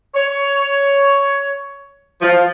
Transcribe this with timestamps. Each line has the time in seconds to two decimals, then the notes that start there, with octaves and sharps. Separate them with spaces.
0.15 C#5
2.22 F3